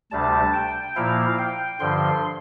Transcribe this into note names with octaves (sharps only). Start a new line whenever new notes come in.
D2 C3 G3 D4 A5
G5
A#2 F3 A#3 E4 F5
G5
G2 D3 F3 C6